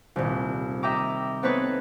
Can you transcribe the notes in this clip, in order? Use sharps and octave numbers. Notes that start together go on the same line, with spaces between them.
D#1 C2
D#5 E5 G5 A#5 D6
B3 C4 D#4 A4 B4 C#5